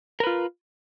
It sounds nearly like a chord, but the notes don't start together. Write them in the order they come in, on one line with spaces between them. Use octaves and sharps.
A#4 B4 F4